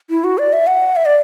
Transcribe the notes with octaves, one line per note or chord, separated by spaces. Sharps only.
E4
F#4
D5
E5
F#5
E5
D5